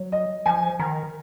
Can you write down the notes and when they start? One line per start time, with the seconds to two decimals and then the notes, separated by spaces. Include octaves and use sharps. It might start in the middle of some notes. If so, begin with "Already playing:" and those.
Already playing: F#3
0.12 D#5
0.46 F3 G#5
0.80 D#3 A#5